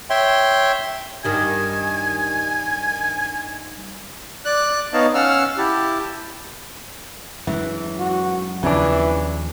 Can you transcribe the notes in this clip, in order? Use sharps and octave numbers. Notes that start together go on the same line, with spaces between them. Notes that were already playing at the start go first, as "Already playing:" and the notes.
C#5 E5 G5 C6
G2 D#3 G3 G#5
D5 F#6
B3 D#4 C#5 D#5 F5 A5
C#4 F5 F#5 E6 F6
E4 G4 A5
F#2 E3 G#3
F#4
D#2 C#3 E3 F3 D4